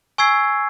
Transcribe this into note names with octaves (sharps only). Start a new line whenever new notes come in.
G#5 C#6 E6 G#6 C7